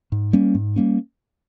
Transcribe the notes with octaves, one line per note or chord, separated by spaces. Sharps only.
G#2
G3 A#3 C#4
G#2
G3 A#3 C#4